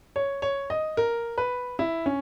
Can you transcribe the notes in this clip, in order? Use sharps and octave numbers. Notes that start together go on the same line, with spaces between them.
C#5
C#5
D#5
A#4
B4
E4
C#4